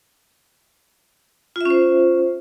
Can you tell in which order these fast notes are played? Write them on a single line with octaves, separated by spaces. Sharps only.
F4 E5 C#4 C5